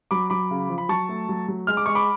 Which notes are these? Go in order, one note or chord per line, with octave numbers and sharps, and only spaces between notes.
F#3 B5 D6
F#3 B5 D6
C#3
F3
B5
F#3 A5 C#6
A3
F#3
F#3
G#3 F6
D6
G#3 C#6
B5 D6